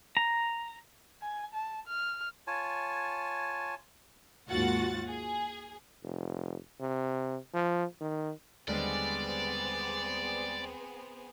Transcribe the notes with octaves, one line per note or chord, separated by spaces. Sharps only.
A#5
G#5
A5
F6
F4 C#5 G#5 A5
D#2 G#2 F4 F#4 F#5 A6
G#4
F1
C3
F3
D#3
D#2 D3 G3 G#3 B3 C4 G#4 D5